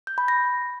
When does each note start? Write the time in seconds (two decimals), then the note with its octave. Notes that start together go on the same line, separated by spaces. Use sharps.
0.07 G6
0.18 B5
0.28 A#6